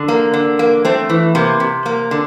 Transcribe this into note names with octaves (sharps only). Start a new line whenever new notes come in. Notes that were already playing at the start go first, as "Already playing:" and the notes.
Already playing: D3
A#3
D3
A#3
A3 C4
E3
C3 A#3
C3
A#3
D3